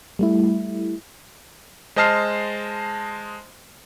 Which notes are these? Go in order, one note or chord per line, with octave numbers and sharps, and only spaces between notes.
G3 A3 E4
G#3 C5 D#5 A5 F6 C7